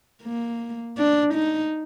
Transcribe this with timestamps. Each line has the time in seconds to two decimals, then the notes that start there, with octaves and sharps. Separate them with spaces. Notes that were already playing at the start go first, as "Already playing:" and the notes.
0.23 A#3
0.98 D4
1.34 D#4